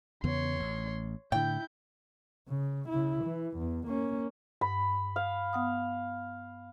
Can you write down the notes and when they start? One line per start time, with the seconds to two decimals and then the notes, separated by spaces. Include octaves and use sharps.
0.24 E2 C#3 B3 C#5 C6
0.60 A1
1.32 A2 D3 E4 G5 G6
2.49 C#3
2.89 C#3 E4
3.25 E3
3.58 E2
3.88 A#3 C#4
4.61 G2 B5
5.16 F5
5.53 B3 F#5 D#6